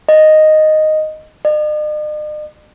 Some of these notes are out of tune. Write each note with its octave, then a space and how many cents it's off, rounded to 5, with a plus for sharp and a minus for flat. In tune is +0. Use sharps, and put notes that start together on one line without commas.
D#5 -5
D#5 -45